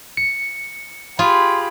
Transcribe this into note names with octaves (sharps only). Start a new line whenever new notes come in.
C#7
F4 G4 G#4 B5 C6